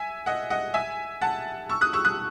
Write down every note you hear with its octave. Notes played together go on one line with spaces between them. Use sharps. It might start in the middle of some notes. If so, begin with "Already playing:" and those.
Already playing: E5 G#5
D#5 F#5
D#5 F#5
E5 G#5
F#5 A5
C#6 E6
D#6 F#6
C#6 E6
D#6 F#6